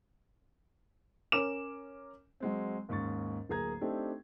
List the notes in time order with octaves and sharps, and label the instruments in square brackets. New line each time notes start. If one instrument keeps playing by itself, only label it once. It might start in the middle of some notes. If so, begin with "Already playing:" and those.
[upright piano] C#4 A#4 D6 E7
[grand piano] F#3 G#3 C4
D#2 G#2 C#4 C#6 A6
D1 A#3 G#4 A#5 G#6
A3 C4 D4 D#4 G4 A4